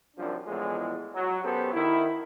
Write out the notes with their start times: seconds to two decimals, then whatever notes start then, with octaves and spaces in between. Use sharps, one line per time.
0.17 C2 F#2 F3 D4
0.47 E2 A2 F3 G#3
1.14 F#3
1.43 F#2 B3 G4 A4 C5
1.73 D#3 E4